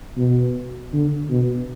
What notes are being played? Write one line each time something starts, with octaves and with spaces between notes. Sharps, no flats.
B2
D3
B2